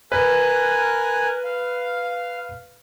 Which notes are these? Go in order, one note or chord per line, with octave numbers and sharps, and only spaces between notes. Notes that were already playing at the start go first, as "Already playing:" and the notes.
A#4 B4 G#5 F#6
F5